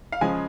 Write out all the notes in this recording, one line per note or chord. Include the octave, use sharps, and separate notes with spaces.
F5
C#3 F3 G#3 G#5